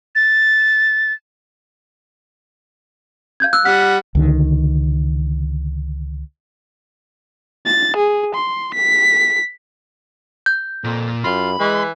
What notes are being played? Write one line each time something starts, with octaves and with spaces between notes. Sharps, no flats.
A6
F5 G6 G#6
E6 F#6
G3 F#5 F6 B6
C#2 D3 D#3
A6
G#4
C6
B6
G6
F2 A#2
F#2 F4 B5
E3 G#3